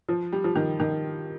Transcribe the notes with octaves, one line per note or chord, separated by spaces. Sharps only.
F3
G3
F3
D#3
D#3